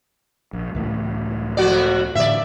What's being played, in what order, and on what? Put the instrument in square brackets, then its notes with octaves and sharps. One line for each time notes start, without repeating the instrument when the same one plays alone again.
[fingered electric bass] A#1
C#2 A2 E3
[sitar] F2 F#4 D5
[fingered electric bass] A2 D3 E3 [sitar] D5 E5